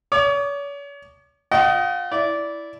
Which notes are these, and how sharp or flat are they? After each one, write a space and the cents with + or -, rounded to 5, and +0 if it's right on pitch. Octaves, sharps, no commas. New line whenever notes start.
C#5 +40 D6 +35
F4 +30 D#5 +10 G5 -45
E4 +0 D5 -15